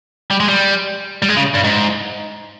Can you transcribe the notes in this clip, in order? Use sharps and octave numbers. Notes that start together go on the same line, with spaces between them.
G3
G#3
G3
G3
G#3
C#3
G2
G#2